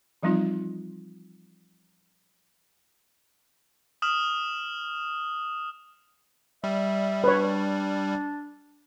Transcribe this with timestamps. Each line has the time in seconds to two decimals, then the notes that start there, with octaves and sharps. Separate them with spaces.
0.23 E3 F3 G3 C4 D#4 F4
4.02 D#6 F6 E7 F#7
6.64 G3 E5
7.24 D4 B4 C#5